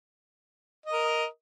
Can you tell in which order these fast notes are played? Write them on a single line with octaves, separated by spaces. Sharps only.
D#5 D#6 A#4